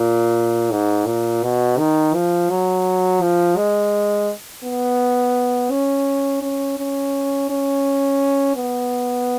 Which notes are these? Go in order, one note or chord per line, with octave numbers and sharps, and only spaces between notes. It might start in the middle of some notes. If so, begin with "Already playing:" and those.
Already playing: A#2
G#2
A#2
B2
D#3
F3
F#3
F3
G#3
B3
C#4
C#4
C#4
C#4
B3